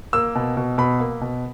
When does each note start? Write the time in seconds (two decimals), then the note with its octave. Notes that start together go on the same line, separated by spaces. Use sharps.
0.13 A#3 E6
0.35 B2
0.57 B2
0.78 B2 B5
1.00 A#3
1.21 B2